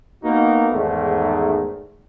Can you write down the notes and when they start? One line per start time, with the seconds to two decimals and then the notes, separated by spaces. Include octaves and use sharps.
0.23 A#3 B3 D#4 F#4
0.71 E2 G#2 D#3 A3